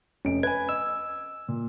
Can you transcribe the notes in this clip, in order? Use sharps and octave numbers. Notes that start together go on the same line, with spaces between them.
F1 C#4 D7
B4 G#5 G#6
D#5 E6
A#2